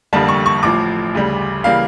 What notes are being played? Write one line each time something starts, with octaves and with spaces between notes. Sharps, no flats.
F1 F2 D3 G3 A#3 A5
C#6
C#6
A1 A2 F3 D6
D2 C#3 G3
C#3 E3 G3 A#3 F5